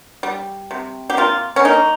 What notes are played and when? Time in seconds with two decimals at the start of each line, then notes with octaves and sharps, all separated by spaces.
0.23 G3
0.71 C3
1.10 G4
1.17 A#3 F4
1.56 C#4
1.65 A#3 D#4